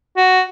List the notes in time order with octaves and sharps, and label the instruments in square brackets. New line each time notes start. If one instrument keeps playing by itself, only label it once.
[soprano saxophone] F#4